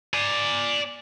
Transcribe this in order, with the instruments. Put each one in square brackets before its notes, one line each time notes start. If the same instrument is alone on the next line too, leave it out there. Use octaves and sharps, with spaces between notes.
[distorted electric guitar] D5 G#5